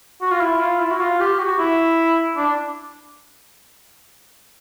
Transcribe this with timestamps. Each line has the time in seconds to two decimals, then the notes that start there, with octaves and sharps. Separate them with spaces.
0.21 F#4
0.31 F4
0.41 E4
0.60 F4
0.80 E4
0.91 F#4
1.00 F4
1.20 G4
1.39 F#4
1.59 E4
2.37 D4